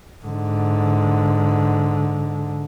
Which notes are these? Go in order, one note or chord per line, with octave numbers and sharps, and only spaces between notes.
G#2 D3